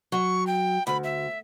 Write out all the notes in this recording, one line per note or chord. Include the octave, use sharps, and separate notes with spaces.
F#3 C#6
G5
D2 B5
E5